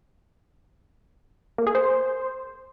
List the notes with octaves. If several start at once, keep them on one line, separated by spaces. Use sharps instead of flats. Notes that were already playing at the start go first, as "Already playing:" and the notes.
A#3
G#4
C5